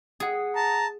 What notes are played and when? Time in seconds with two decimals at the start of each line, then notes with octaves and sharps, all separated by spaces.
0.20 G#4 F#5 D#6
0.56 A5 A#5